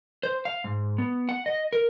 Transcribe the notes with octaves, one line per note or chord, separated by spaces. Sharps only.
C5
F5
G#2
B3
F#5
D#5
A#4